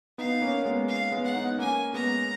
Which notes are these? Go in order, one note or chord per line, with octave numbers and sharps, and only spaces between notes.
B3 D#4 F5
A#3 C#4
C#4
G#3 B3
F5
G#3 B3
F#5
B3 D#4
A#3 C#4 G#5
G#3 B3 A#5